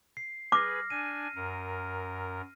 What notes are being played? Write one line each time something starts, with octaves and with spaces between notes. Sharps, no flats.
C7
G#4 B4 D6 F6 A#6
D4 G#5 D#7
F#2 A#4